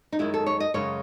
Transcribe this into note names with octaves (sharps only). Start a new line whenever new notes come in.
D#4
F#2 D#3 G#3 E4
A4
C#5
D#5
F#2 C#3 G#3 C#5